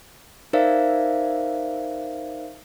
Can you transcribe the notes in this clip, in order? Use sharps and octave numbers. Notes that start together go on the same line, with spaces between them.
D#4 A#4 C5 D5 E5 F5